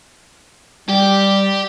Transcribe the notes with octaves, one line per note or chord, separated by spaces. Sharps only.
G3 G4